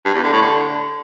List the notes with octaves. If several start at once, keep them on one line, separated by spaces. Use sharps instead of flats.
G2
E2
D3
A2
D3